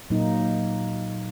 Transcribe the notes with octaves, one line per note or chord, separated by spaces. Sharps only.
A#2 F#3 A#3 D#4